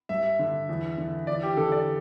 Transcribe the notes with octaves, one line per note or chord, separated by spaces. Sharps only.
G2 E5
D3
E2
D3
E2 D5
G4
D3 A4
D5